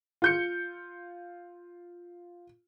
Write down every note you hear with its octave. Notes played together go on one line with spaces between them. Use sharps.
F4 G6 C#7